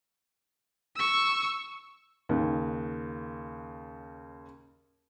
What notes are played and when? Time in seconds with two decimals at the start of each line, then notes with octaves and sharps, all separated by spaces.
0.96 C#6 E6
2.29 D#2 C#3